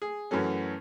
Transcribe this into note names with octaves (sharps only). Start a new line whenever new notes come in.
G#4
F#2 E3 F#3 A3 C#4